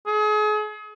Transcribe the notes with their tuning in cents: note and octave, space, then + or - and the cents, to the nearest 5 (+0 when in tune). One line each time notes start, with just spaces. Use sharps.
G#4 +35